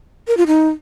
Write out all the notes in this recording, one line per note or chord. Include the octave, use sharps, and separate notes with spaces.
A#4
F4
D#4